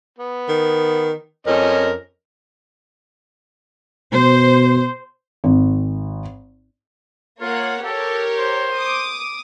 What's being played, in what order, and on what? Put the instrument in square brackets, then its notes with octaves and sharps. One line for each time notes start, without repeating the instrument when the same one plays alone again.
[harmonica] B3
[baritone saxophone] D#3
[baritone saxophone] F2 [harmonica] C#4 A#4 D#5
[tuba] B2 [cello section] C5
[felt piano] G#1
[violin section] A#3 C#5 F#5 [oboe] F4
[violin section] G4 A#4 C#5 [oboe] A4
[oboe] C5
[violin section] D6 D#6